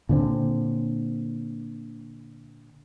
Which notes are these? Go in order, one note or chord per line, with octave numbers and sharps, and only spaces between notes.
A#2 D3 C4